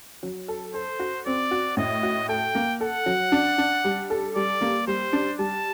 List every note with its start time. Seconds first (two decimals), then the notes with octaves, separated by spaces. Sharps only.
0.23 F#3
0.48 A4
0.74 A4 C5
1.00 F#4
1.26 C4 D5
1.51 F#4
1.77 A2 D#5
2.03 F#4
2.29 A4 G5
2.55 A#3
2.81 A4 F#5
3.06 F#3
3.32 D4
3.58 D4
3.84 G3
4.10 A4
4.36 G3 D5
4.61 A#3
4.87 G3 C5
5.13 D4
5.39 G3 A5